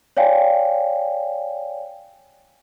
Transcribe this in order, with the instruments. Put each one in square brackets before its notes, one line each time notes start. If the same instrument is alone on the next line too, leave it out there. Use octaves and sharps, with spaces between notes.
[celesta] C#5 D5 F5 G5 G#5